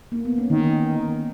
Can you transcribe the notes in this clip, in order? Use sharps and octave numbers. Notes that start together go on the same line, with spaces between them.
A#3
B3
C#4
D#3 D#4